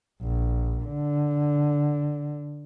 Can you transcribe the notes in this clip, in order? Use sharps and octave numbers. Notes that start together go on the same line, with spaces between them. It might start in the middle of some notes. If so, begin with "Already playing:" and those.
A#1
D3